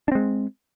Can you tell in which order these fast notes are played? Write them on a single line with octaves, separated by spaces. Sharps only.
D4 C4 G#3